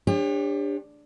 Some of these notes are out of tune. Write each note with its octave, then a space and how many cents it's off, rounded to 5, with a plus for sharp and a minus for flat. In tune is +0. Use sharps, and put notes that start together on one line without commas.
D4 +0 G4 +35 C#5 -35